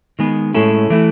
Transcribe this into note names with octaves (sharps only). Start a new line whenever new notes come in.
D#3 G#3 B3
A2 G#3 C#4 E4 A4
E3 A3 E4